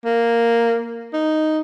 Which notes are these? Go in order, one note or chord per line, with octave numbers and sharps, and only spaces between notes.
A#3
D#4